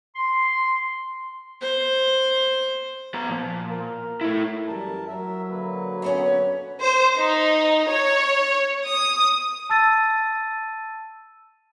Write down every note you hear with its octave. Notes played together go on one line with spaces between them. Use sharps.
C6
C5
B3 A#5
A#2 F3
A#4
A3 E4
F#2 E3 G3 A#4 A5
F#3 A#4 E5
D3 A#3 B4
F#2 B3 C#4
C5
D#4
C#5
D#6
A5 E6 A6 D#7